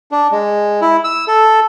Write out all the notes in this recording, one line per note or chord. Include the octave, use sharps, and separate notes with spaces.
D4
G#3
E4
E6
A4